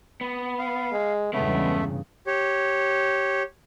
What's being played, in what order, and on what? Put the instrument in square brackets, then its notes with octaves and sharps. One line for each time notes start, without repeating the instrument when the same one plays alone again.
[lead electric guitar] B3
[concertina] F5
[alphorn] G#3
[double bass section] E2 G2 C#3 [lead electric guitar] G#3 C#4 [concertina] A3 E5 [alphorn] B3
[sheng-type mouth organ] G4 C#5